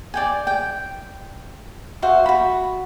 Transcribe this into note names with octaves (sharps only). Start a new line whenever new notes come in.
D5 G5 G#5
G5
F#4 C5 E5 F5
F#4 B5